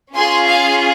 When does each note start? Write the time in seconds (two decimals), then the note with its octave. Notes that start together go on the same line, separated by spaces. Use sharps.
0.15 C#4 F4 G#4 G#5 C6
0.48 F5 G#5